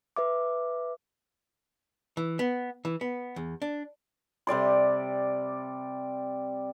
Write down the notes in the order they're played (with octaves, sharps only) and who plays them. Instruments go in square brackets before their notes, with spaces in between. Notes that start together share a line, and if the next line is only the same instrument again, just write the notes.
[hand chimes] B4 E5 D6
[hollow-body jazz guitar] E3
B3
E3
B3
E2
D4
[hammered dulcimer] C3 G3 D5 C6